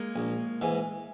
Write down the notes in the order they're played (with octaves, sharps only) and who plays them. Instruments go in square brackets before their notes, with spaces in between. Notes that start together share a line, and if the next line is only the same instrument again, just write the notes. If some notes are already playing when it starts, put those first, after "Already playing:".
Already playing: [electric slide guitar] G#3 A#3
[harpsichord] A#1
G#2 E3